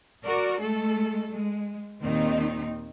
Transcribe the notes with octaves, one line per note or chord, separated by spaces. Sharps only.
F#4 A#4 D5
G#3 A3 A4
G#3
D#2 A#2 D#3 C4 D#4